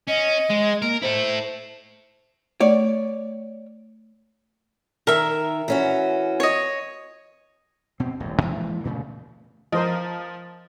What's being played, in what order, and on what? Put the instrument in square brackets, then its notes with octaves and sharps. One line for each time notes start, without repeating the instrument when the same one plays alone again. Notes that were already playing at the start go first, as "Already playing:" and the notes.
[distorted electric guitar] C#4 [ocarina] D#5
[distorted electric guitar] G#3
[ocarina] A#3 [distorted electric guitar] A#4
[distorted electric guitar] E4 A4 [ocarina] C5
[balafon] A3 [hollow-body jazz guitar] C#5 D5
[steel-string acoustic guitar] D#3 [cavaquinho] A#4 E5
[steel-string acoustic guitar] E3 C#4 F#4
[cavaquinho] C#5 D#5
[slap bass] B2 C4
D#1 A1 F#2
G#2 E3 F3 A#3
G2 A#2 C#3 A3
[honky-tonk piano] F3 [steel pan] A#4 C5 D#5